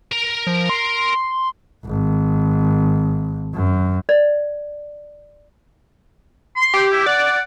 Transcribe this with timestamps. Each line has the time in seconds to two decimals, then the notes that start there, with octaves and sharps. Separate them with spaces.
0.12 A#4 A#5
0.47 F3
0.69 C6
1.85 G#1
3.54 F#2
4.09 D5
6.56 C6
6.73 G4
6.92 E4
7.06 D5 F#5